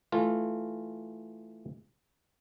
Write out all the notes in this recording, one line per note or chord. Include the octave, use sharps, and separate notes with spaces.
E3 A3 F4